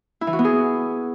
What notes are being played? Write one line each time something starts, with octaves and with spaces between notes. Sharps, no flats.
E4
E3
F#4
B3
G#4